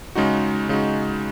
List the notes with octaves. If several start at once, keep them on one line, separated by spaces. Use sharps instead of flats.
C#3 G#3 D#4 F#4
C#3 G#3 D#4 F#4